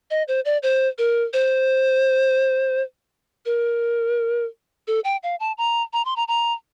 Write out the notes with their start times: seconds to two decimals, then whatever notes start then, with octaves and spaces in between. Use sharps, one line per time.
0.11 D#5
0.28 C5
0.45 D5
0.63 C5
0.98 A#4
1.33 C5
3.46 A#4
4.88 A4
5.04 G5
5.23 F5
5.40 A5
5.58 A#5
5.93 A#5
6.05 C6
6.16 A#5
6.28 A#5